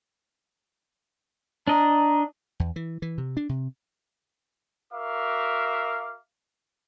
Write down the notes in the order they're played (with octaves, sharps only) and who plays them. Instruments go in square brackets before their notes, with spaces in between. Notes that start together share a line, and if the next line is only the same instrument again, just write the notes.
[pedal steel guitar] D4 D#5 [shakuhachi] A#5
[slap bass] E2
E3
E3
C3
D4
C3
[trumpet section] F#4 A#4 E5 F5 D6